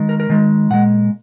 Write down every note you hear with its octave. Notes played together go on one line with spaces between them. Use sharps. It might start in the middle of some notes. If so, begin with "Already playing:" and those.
Already playing: D#3 G#3
A#4
A#4
D#3 G#3
A#2 G#3 F#5